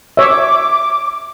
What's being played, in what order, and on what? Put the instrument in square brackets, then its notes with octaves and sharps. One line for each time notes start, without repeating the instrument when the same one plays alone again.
[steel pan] C#5 E5 [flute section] D6